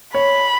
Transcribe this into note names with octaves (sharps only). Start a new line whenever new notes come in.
C#5 B5